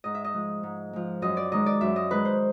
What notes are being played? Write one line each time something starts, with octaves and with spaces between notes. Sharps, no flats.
G#2 D#5
E5
D#5
F3 G#3
G#2
F3 G#3
F#2 D#5
D5
D#3 G#3 D#5
D5
F#2 E5
D#5
D#3 G#3 B4
C5